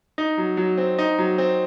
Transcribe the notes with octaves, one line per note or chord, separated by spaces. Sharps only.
D#4
F#3
F#3
C4
D#4
F#3
C4